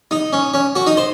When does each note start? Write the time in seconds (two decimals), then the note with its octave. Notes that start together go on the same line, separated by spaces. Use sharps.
0.11 D#4
0.33 C#4
0.54 C#4
0.75 F#4
0.87 D#4
0.97 C5